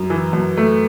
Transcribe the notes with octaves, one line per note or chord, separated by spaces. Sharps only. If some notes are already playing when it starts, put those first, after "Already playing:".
Already playing: F#2
E3
F#2
A3